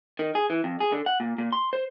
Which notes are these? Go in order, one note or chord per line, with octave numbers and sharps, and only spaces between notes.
D#3
G#4
E3
F2
G#4
D3
F#5
A#2
A#2
C6
C5